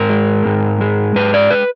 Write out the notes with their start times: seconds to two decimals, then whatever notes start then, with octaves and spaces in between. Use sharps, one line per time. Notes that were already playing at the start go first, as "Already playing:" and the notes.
Already playing: G#2 A#4
0.09 G#3
0.46 G#2
0.81 G#3
1.16 G#2 B4
1.34 D5
1.51 B4